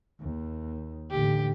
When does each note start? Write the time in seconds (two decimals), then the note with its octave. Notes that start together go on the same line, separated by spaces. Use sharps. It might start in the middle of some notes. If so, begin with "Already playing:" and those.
0.20 D#2
1.11 A1 D3 G4